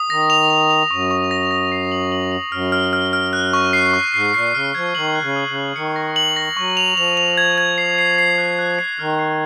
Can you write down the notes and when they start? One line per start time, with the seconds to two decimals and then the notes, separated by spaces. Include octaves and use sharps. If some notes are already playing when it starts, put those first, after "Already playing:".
Already playing: D#6
0.10 D#3 A#6
0.30 F7
0.50 F7
0.70 F7
0.91 F#2 C#6
1.11 C#6
1.31 A#6
1.51 A#6
1.72 C7
1.92 F#7
2.12 F#7
2.32 F#7
2.52 F#2 F6
2.72 F6
2.93 F6
3.13 F6
3.33 F#6
3.53 C#6
3.73 C7
3.94 C#6
4.14 G#2 C7
4.34 A#2 C7
4.54 C#3 F6
4.75 F3 G#6
4.95 D#3 F#7
5.15 F#6
5.22 C#3
5.36 D#6
5.48 C#3
5.56 F#6
5.76 D#3 C#7
5.96 A#6
6.16 F#7
6.36 A#6
6.57 F#3 C#6
6.77 F7
6.97 F3 F7
7.17 F7
7.38 G#6
7.58 G#6
7.78 C7
7.99 C7
8.18 C7
8.38 F#6
8.59 F#6
8.79 C7
8.99 D#3 F6
9.19 C7